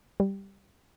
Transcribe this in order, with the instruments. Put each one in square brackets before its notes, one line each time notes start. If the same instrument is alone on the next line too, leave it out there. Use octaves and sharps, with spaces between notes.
[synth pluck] G3